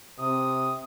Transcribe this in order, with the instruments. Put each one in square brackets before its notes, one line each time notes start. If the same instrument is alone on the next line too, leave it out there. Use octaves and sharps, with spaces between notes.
[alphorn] C3 [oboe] D#6